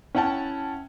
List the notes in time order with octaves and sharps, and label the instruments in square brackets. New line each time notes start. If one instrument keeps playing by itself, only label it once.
[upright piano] C#4 E4 F#5 G5 A5